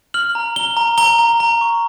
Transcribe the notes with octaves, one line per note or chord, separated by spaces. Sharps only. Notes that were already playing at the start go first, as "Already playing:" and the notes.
F6 F#7
A#5
A#5 G7
A#5
A#5 G7
A#5
A#5
C#6